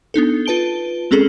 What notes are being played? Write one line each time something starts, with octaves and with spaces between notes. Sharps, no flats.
B3 D4 D#4 A4
F4 B4 A5 D7 G7
G#3 C4 C#4 G#4 A4